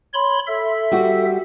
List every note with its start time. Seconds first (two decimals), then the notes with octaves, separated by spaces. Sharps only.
0.14 C#5 B5 C6
0.47 A4 E5
0.92 G3 F#4